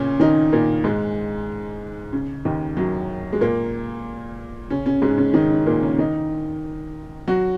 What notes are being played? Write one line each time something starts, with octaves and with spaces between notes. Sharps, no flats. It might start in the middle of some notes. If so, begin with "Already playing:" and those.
Already playing: A#2 C#3 A#3 C#4
D#3 D#4
A#2 A#3
G#2 G#3
C#3
D#2 D#3
F#2 F#3
G#3
A#2 A#3
C#3 C#4
C#3 C#4
G#2 G#3
C#3 C#4
D#3 D#4
C#3 C#4
A#2 A#3
C#3 C#4
D#3 D#4
F#3 F#4